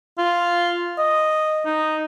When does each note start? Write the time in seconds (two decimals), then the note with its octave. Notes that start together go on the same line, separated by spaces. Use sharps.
0.18 F4
0.98 D#5
1.66 D#4